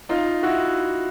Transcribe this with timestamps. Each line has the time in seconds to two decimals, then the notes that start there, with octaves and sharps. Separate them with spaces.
0.09 D#4 F4
0.43 E4 F#4